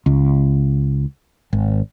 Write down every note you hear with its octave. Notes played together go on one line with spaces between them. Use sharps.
C#2
G#1